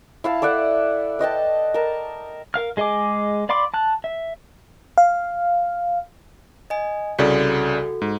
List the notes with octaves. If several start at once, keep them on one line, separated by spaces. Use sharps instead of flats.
E4 F5 A5
A4 D5 E5 F#5
B4 D#5 G5 A5
A#4 A5
A#4 F5 F6
G#3 G#4 D#5 G#5 D6
D5 F5 B5 C6 D6
A5 F#6
E5
F5
D#5 G#5
C2 C#3 F#4 A4 D5
G#2